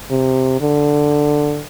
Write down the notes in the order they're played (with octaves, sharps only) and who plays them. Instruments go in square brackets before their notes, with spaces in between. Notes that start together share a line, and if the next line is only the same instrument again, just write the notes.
[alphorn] C3
D3